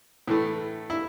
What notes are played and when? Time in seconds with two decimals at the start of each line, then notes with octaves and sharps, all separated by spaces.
0.28 A2 E3 A3
0.90 E4